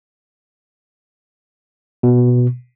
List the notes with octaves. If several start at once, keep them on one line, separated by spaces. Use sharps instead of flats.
B2